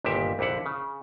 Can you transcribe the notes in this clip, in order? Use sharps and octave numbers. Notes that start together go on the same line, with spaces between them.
G1 D#2 A#2 G4 E5
A#1 F2 D3 E4 F#5
C#3